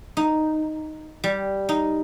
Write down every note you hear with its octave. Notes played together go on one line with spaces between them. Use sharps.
D#4
G3
D#4